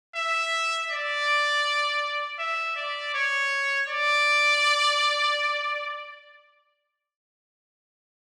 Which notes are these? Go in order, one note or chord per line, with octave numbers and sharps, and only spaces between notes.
E5
D5
E5
D5
C#5
D5